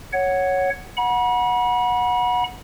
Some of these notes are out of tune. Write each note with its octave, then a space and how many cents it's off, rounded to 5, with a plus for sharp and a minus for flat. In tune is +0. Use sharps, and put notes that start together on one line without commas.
C#5 +0 F#5 +5
F#5 -15 B5 -40